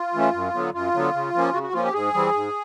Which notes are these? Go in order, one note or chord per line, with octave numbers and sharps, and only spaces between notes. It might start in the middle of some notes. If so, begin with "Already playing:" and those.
Already playing: F4
E3 A3 C#4
F#2
D3 F#3 B3
F#2 F4
D3 F#3 B3
C#3
F3 A#3 C#4
C#3 F#4
F#4
F3 A#3 C#4 F4
G4
G#2 G#4
E3 G3 C4
G#2